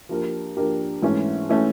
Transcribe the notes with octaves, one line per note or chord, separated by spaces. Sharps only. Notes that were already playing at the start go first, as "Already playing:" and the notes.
F3 A#3 D4 G4 A#4
F3 A#3 D4 G4 A#4
G#2 E3 A3 C#4
E3 A3 C#4